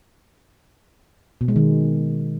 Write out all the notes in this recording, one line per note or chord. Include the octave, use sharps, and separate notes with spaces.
B2
G#3
D#3